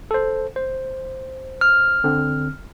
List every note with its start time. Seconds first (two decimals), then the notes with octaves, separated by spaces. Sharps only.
0.11 A4 C5
0.56 C5
1.61 F6
2.04 D3 C4